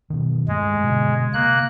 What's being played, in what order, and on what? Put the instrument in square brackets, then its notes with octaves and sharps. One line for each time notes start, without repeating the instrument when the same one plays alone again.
[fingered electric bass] B2 D#3
[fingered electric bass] G2 A3 [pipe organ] G#3
[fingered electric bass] B2 D3
[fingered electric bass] C3 [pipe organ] A#3 F#6